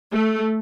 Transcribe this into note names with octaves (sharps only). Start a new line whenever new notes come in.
A3